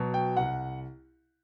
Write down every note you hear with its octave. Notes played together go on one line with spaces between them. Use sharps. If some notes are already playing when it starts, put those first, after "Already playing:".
Already playing: B2 F#3
G5
C2 F#5